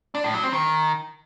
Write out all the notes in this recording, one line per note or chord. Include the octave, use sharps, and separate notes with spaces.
D4
A2
F#3
C4
D#3